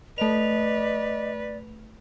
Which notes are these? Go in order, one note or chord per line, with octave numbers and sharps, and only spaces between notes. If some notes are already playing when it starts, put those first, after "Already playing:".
A3 B4 D5 D#5 F7